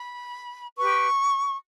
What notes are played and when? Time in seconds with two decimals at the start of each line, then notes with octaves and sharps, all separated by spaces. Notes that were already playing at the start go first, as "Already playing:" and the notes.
Already playing: B5
0.76 G4 B4 C#6